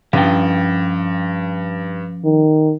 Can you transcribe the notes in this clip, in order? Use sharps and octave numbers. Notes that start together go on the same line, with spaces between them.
G2 F3 C#4 G5
D#3